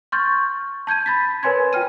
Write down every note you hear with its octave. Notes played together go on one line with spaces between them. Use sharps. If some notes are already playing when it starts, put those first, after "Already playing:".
C6 C#6 F6 G6 A6
A5 G6 G#6 D#7
B5 A6 B6
A#4 B4 C#5 G#5 C6 G#6
F4 G5 F6 D#7